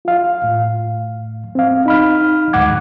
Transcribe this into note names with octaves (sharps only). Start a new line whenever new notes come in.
F4 F5
A2
C4 F5
D#4 B5 F6
D2 G#2 F#5 D6 G#6